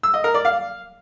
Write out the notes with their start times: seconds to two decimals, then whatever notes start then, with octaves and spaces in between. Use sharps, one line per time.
0.03 E6
0.14 D#5
0.24 A#4
0.34 D5
0.45 F5